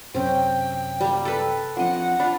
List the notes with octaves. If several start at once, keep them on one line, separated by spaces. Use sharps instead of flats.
F#2 C3 C4 C#4 G5
G3 A#3
A4 B4
F3 C4 D4 F4 D#5 F#5
D4 F4 B5